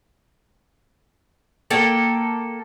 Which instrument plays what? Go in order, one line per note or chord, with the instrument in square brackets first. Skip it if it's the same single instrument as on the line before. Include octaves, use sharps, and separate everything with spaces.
[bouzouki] A#3 A4 G5